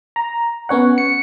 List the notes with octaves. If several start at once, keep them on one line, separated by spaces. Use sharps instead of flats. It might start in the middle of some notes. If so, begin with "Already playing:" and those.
A#5
B3 C#4 C#5 F#5
C#7